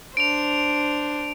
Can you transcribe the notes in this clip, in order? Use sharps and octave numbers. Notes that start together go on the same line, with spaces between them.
D4 C5 D7 F7